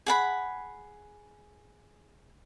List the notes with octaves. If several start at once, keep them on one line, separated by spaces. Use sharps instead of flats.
G#4 F#5 B5